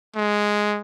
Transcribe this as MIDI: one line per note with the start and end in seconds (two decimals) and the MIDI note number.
0.16 0.81 56